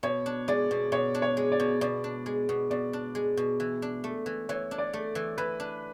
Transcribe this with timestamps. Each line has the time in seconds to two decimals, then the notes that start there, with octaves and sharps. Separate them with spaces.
0.03 B2 C#5
0.26 D4
0.48 G#3 D5
0.71 B2
0.92 B2 C#5
1.15 D4
1.22 C#5
1.37 G#3
1.52 D5
1.60 B2
1.81 B2 D5
2.04 D4
2.26 G#3
2.49 B2
2.70 B2 D5
2.93 D4
3.15 G#3
3.37 B2
3.60 E3
3.82 D4
4.04 A3
4.26 E3
4.49 E3 C#5
4.71 D4
4.78 D5
4.93 A3
5.15 E3
5.38 E3 B4
5.60 D4